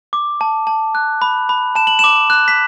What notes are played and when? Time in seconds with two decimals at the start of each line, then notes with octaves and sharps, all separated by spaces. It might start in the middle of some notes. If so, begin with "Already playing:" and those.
0.13 D6
0.41 A5
0.67 A5
0.95 F#6
1.22 B5
1.49 B5
1.75 A5 E7
1.87 F#7
1.99 D6 E7
2.30 F#6
2.48 B6